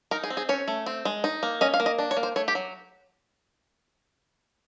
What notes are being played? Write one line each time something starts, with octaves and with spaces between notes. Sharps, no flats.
D#4 A#4
G#4
C4
G#4
C#4 C#5
A3
C4
G#3
D#4
A#3
C#4 D#5
F5
A#3
D#5
D4
C#5
A#3
C5
A3 C#5
G4
F#3